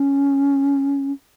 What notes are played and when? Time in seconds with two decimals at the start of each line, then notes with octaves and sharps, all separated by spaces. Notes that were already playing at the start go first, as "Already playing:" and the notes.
Already playing: C#4